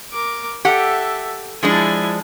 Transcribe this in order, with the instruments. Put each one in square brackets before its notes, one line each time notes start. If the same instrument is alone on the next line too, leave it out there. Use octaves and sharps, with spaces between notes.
[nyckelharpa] A#4 D6
[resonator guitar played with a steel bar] G4 F#5 [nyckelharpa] A4 E5
[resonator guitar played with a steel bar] F3 G#3 D4 [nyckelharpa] E4 G#5